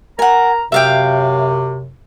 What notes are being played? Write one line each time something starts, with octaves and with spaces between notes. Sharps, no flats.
A#4 F#5 G#5 A#5
F#2 C3 E5 F5 G5